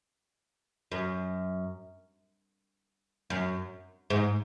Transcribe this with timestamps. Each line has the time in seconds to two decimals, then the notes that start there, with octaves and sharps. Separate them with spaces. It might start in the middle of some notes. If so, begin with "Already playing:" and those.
0.92 F#2
3.30 F#2
4.10 G#2